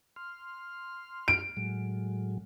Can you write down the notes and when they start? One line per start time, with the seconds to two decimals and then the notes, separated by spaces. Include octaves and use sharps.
0.16 C6 F6
1.28 D7
1.57 A2 F#3 G#3